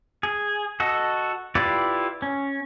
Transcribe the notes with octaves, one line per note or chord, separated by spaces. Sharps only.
G#4
F#4 A4 D#5
E4 F4 G4 B4 D5
C#4